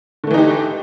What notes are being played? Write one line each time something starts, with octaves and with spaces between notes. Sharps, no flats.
D3 E3 A3 D#4 G4